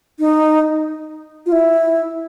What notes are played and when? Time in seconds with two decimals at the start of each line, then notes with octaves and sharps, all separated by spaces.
0.20 D#4
1.46 F4
1.52 E4